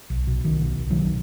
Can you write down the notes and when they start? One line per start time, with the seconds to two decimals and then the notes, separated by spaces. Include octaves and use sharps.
0.10 B1
0.27 B2
0.45 B1 D#3
0.62 B2
0.79 B1
0.90 D#3 F#3
0.96 B2